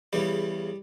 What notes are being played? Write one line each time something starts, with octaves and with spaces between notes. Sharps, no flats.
E2 C#3 E3 G3 G4